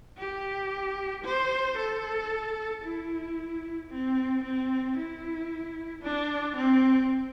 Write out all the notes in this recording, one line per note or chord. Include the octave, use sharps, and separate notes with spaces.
G4
C5
A4
E4
C4
C4
E4
D4
C4